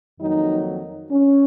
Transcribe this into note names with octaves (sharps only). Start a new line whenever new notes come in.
F2 D#3 F#3 A#3 D#4
C#4